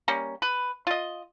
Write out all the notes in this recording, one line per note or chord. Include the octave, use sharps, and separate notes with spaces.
G3 A#3 C#4
B4
F4 D#5